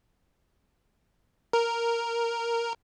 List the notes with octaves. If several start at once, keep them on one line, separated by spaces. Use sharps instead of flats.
A#4